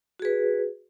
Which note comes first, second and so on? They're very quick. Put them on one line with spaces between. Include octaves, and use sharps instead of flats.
F#4 G#4 B4